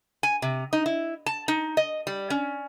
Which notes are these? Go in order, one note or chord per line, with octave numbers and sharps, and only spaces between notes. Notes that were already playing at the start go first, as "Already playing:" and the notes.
G#5
C3
D#4
E4
A5
D#4
D#5
G3
C#4